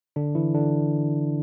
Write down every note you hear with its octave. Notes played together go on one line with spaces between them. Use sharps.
D3 D4
E3 E4
D3 D4